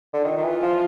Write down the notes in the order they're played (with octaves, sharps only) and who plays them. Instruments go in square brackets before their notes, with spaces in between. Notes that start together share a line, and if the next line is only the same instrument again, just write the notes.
[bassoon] D3
[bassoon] D#3 [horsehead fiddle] F4
[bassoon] D#3
E3
F3